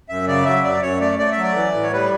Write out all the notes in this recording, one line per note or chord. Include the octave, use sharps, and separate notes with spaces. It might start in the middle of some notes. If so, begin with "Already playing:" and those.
F#2 E5
C#3 D5
F#3 E5
F#2 D5
F#2 C#5
A3 D5
A3 D5
E5
F#3
D5
E3
A2
C#5
G3 B4